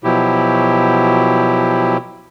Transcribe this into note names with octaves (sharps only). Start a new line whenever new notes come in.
B2 F3 F#3 E4 G4